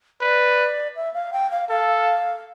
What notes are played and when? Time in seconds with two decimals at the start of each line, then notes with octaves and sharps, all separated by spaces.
0.21 B4 D5
0.96 E5
1.14 F5
1.33 G5
1.51 F5
1.69 A4 F5